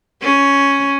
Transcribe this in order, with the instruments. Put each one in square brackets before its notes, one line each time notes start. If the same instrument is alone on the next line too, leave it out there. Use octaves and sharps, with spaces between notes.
[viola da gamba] C#4